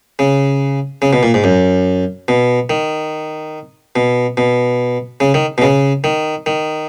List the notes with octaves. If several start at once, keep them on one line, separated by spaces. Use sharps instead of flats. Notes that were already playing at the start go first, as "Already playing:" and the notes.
C#3
C#3
B2
A#2
G#2
F#2
B2
D#3
B2
B2
C#3
D#3
B2
C#3
D#3
D#3